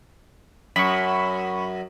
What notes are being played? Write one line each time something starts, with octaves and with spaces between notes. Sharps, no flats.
F#2 B5 C#6